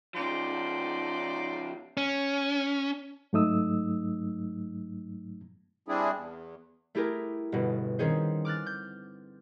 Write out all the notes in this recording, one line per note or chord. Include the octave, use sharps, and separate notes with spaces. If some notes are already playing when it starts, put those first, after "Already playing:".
C#3 F3 D#4 C5 D5
C#4
G#2 F#3 A3 D#4 D#6 E6
G3 C4 D4 E4 G#4
E2
A3 E4 G4 G#4 A#4
G1 B2
D#3 C4 C#4 G#4 C5
D6 F6 F#6 A6
G6